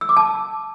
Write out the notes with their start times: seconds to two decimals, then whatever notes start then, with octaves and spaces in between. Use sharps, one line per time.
0.01 E6
0.09 D6
0.17 A5